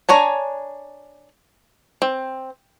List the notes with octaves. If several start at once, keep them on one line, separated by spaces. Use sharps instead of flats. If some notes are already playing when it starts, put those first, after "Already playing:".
D4 C#5 G#5 A#5
C4